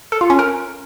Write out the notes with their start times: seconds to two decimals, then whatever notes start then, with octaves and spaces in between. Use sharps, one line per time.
0.12 A4
0.21 F4
0.30 C#4
0.39 A#4